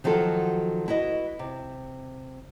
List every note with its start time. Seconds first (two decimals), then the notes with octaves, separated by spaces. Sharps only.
0.04 D#3 F3 F#3 F#4 A4
0.88 E4 F#4 B4 D#5
1.39 C3